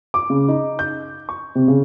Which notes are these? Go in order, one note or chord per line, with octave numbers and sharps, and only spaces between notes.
D6
C#3
D#4
G6
C#6
C3
C#3